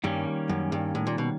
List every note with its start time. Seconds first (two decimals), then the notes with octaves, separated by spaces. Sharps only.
0.04 G2 D#3 G3 A#3 C#4
0.49 F#2
0.72 G2
0.95 A2
1.07 A#2
1.18 B2